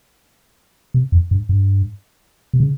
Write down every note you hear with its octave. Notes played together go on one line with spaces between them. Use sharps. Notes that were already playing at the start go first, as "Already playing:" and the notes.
C3
F2
G2
G2
C3
C#3